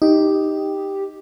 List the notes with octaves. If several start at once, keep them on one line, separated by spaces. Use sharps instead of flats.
D#4 G4